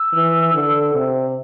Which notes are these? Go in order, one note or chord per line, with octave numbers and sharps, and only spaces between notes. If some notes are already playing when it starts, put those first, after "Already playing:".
Already playing: E6
E3
D3
C3